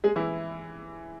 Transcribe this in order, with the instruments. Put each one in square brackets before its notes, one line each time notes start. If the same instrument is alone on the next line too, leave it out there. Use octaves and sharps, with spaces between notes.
[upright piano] G#3 G#4
E3 E4